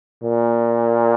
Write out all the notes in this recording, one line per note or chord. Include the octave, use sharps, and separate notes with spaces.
A#2